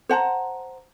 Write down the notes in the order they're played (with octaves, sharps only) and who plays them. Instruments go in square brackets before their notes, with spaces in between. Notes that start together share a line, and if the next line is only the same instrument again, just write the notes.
[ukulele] C5 F#5 A5 A#5